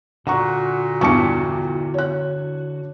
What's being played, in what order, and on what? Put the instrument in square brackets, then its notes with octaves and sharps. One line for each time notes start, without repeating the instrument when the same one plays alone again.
[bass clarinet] A#2 [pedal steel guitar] D3 F#4 [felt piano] F#5 A#5 C#6
[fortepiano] E2 G2 A5 [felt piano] C#6 D6 C#7
[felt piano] C#5 F#6